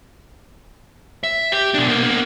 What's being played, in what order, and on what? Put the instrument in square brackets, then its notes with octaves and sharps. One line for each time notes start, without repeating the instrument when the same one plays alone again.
[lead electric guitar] E5
G4
B2 D4
A#3 B3